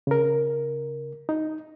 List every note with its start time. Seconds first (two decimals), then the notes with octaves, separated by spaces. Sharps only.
0.07 C#3 A#4
1.29 D#4